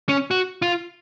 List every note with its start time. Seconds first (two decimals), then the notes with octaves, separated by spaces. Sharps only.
0.09 C#4
0.31 F#4
0.62 F4